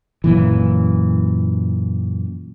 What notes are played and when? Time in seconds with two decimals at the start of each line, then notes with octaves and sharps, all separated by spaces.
0.24 F#2 A#2 E3